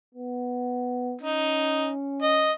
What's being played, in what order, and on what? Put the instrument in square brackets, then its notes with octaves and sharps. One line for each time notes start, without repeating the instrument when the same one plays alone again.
[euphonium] B3
[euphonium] C#4 [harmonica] D#4
[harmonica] D#5